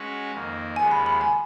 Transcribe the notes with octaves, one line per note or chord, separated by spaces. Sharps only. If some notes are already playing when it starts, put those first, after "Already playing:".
Already playing: G#3 C#4 F#4 B4
F2 D#3 A#3
D#2 C#3 F3 G#3 B3 G#5
B5
B5
G#5